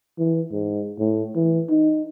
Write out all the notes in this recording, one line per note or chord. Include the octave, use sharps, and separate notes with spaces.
E3
G#2
A2
E3
D#4